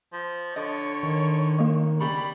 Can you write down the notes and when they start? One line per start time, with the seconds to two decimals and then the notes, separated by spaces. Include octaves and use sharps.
0.13 F3
0.56 D3 C#5 D#5
1.03 D#3
1.59 A#3 D#5
2.01 C#3 G3 B5 C#6